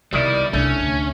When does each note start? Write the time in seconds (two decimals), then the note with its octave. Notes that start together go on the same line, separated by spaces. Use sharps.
0.13 C2 B2 D#3 G3 E4 D5
0.53 C2 A3 C#4 D4
0.81 D2